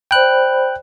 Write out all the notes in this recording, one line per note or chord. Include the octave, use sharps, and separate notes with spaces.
C5 D5 G5 B5 F#6